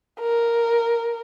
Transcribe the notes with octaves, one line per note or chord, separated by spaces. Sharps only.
A#4